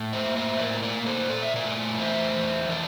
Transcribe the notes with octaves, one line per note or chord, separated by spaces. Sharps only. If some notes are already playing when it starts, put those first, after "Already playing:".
Already playing: A2
C5 E5
A#3
C5 E5
A2 A#4 D5
A#4 D5
A#3
A4 C5
A#2 D5
E5
A#4 D5
A3
E2 C5 E5
E2
E3 A#4 D5